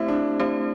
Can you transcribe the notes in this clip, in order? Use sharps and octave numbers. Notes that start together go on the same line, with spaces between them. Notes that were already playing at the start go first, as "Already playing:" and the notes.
Already playing: A3 C4 E4 G4 C5
D4
A3 C4 G4 C5